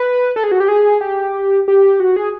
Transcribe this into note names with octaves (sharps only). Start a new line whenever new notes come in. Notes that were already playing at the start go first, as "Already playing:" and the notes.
Already playing: B4
A4
G#4
F#4
G4
G#4
G4
G4
F#4
G#4